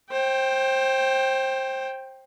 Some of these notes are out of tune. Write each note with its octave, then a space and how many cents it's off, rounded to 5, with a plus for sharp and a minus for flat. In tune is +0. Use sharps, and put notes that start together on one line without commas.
C5 +25 G5 +0